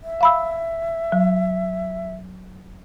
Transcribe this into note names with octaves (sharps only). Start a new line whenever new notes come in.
E5
F5 B5 E6
F#3